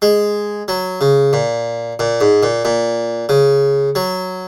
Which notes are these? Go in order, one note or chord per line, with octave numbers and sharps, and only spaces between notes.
G#3
F#3
C#3
A#2
A#2
G#2
A#2
A#2
C#3
F#3